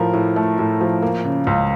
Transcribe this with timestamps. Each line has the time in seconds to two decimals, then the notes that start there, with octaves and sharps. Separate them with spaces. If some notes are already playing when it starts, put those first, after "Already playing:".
Already playing: A2 F3 A#4
0.13 A2
0.36 A3
0.59 A2
0.81 F3
1.02 A#3
1.25 C#3
1.47 C#2